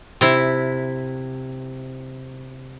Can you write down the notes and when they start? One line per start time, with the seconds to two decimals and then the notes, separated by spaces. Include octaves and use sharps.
0.21 C3 E4